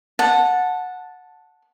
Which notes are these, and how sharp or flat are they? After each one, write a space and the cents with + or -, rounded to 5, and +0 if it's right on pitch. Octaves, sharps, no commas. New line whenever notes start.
F#5 -15 A5 +0